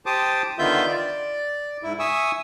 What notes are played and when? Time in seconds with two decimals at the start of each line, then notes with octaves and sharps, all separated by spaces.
0.06 G4 C5 A5 D6 D#6
0.59 D3 D#3 B3 F4 E5 G6
0.87 D5
1.83 G#2 E4
1.99 E5 G#5 C#6 D#6 E6